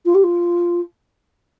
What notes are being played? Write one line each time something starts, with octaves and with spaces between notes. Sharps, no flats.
F4
G4
F4